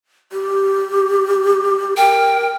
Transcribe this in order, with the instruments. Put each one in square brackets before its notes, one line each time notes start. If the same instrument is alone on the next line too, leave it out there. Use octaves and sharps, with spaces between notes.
[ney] G4
[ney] A#4 [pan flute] G5